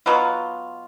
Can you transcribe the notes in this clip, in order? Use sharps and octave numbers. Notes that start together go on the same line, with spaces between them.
B2 F#3 B3 F4